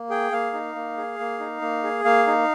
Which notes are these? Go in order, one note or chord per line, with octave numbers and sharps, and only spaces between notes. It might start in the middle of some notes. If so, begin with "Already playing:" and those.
Already playing: A#3
G#4 G5
A#3 F5
D#4
A#3
G#4
A#3
D#4
A#3
G#4
A#3 F5
D#4